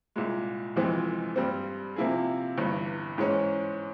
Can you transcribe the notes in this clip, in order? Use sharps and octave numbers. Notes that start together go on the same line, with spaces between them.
C2 A#2 G#3
F1 F2 E3 G#3 C4
G2 G3 C4
C3 F3 A#3 E4 G#4
G1 G2 E3
G#2 E3 G#3 C#4